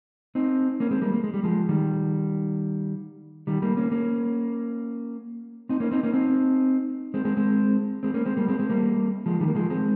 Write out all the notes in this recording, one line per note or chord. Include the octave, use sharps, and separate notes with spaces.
C4 D#4
A#3 C#4
G#3 C4
G3 A#3
A#3
G#3
G3
F3 G#3
D#3 G3
D#3 G3
G3 A#3
A#3 C#4
A#3 C#4
C4 D#4
A#3 C#4
C4 D#4
A#3 C#4
C4 D#4
G#3 C4
G#3 C4
G#3 C4
G#3 C4
A#3 C#4
G#3 C4
G3 A#3
G#3 C4
G#3 C4
G3 A#3
F3 G#3
D#3 G3
A#3
F3 G#3
G#3 C4